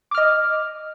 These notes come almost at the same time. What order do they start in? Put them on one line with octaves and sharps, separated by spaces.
D6 F6 D#5